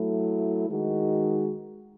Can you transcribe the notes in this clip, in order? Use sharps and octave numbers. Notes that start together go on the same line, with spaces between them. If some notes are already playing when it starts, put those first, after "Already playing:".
Already playing: F#3 A3 E4
D#3 G#3 D#4 F#4